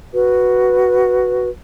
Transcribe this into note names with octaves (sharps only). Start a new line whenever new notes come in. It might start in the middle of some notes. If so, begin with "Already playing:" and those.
F#4 B4